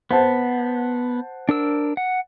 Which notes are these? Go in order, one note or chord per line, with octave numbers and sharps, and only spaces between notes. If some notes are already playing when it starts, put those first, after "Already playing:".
B3 C5 F#5 A5
D4 A#4 E6
F#5